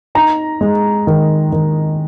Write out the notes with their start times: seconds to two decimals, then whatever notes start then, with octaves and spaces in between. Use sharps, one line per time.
0.15 D#4 A#5
0.61 G#3
1.07 D#3
1.52 D#3